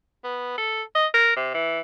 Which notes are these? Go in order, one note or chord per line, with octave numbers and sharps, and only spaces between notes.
B3
A4
D#5
A#4
C3
E3